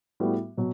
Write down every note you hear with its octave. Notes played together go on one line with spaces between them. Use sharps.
A2 G3 B3 F#4
B2 F#3